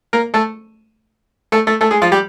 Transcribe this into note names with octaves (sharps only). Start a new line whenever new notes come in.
A#3 A#4
A3 A4
A3 A4
A3 A4
A3 A4
G#3 G#4
F3 F4
G3 G4